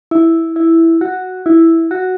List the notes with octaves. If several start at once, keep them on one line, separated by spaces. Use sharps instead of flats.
E4
E4
F#4
E4
F#4